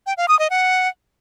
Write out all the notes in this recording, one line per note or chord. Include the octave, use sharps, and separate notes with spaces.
G5
F5
D#6
D#5
F#5